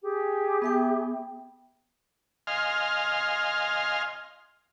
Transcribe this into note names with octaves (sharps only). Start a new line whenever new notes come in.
G4 G#4
B3 E5 G5
D#5 F5 G#5 C6 F6